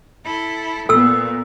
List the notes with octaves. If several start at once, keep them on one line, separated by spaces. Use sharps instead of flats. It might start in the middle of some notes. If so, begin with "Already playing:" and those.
E4 A4
A#2 B3 A4 E6